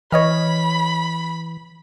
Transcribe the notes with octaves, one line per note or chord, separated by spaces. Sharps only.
E3 C#5 D#5 B5 F6